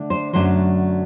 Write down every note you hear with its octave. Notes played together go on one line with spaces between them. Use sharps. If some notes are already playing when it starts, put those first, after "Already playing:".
Already playing: D3 A3 D4
C5
F#2 D3 F#3 A3 D4 C5